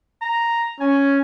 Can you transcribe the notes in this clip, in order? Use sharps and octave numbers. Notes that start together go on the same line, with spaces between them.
A#5
C#4 G#5